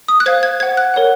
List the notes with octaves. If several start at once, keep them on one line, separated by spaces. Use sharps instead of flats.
D#6
F#6
C5 F5 G#6
G#6
C5 F#5 G#6
F#6
A#4 C#5 F#5